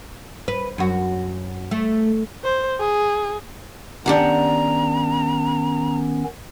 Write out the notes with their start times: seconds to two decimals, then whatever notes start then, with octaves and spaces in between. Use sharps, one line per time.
0.48 B4
0.78 F#2 F#4
1.71 A3
2.44 C5
2.80 G#4
4.06 D#3 B3 C#4 D4 G4 F#5 A#5